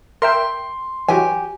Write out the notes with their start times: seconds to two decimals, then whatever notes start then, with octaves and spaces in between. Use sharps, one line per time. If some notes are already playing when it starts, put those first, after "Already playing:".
0.22 A#4 E5 G5 C6
1.08 E3 F#3 F#4 G4 G#5